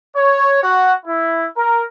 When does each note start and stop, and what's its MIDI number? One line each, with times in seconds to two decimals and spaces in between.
0.16 0.61 73
0.63 0.92 66
1.06 1.45 64
1.57 1.82 70